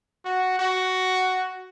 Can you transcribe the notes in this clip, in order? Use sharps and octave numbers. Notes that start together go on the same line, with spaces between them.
F#4
F#4